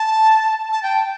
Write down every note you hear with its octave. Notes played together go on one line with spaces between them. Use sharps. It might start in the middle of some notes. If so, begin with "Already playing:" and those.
Already playing: A5
A5
G5